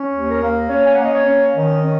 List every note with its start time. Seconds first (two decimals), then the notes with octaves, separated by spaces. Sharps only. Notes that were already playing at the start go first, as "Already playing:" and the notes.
Already playing: C#4
0.13 D#2
0.28 A#4
0.42 A#3
0.69 C#4 C#5
0.83 G#5
0.92 F#5
0.97 A#3 D#5
1.12 C#5
1.26 C#4
1.54 D#3 D#5
1.82 C#4